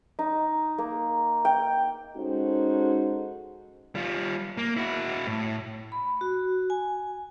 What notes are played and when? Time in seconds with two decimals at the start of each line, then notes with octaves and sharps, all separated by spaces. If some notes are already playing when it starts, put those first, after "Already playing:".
0.19 D#4
0.78 A#3
1.45 G5
2.17 G#3 C#4 D#4 F#4 A4 C5
3.95 G3 F4
4.57 A#3
4.77 E4 F#4
5.27 A2
5.92 B5
6.21 F#4
6.70 G#5